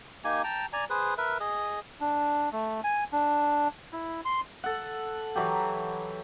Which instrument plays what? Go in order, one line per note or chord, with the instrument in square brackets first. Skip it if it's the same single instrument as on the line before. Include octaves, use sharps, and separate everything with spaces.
[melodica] A#3 D#4 G4 G#5
G5 A5 A#5
D5 G#5 A#5
G#4 B4 C5
A#4 B4 E5
G#4 D#5
D4
A3
G#5
D4
E4
C6
[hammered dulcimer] A4 F#5
E3 F#3 G4